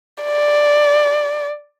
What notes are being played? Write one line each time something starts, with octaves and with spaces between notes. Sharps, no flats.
D5